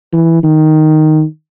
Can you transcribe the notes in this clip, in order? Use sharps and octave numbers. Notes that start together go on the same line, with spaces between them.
E3
D#3